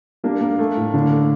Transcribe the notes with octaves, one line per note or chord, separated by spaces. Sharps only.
G3 A#3 D4
A#3
A3
A2
D3 A#3 D4
A3